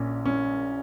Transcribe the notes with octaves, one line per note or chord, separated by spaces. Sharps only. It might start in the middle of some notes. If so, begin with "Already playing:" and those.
Already playing: A#1 A#2 C#4
C#4